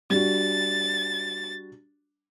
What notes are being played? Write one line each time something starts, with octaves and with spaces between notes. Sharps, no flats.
G3 D4 F#4 A6